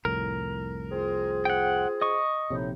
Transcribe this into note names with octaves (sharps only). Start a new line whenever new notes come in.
C2 F2 A2 A#4
C4 F4 G#4
F#5 G5
D#5 C#6
A#1 A2 C3 D#4